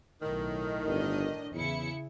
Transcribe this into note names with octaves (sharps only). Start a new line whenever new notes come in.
B1 A2 D#3
G1 D4 D#5
E2 C#3 E4 C#7